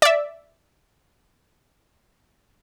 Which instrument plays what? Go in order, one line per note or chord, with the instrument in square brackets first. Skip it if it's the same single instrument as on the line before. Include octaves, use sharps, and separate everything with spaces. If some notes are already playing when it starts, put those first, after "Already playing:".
[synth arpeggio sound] D5 E5